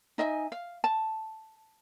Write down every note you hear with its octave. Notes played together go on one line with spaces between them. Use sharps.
D#4 D#5 E5 G#5
F5
A5